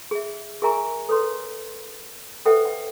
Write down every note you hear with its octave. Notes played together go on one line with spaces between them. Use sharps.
G#4 E5
G#4 A#4 E5 G#5 A#5 C#6
A4 B4 C#5 C6
A4 B4 C5 E5 F#5 G5
F#5